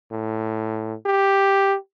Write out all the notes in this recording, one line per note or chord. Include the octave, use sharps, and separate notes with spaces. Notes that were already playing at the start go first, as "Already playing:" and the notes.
A2
G4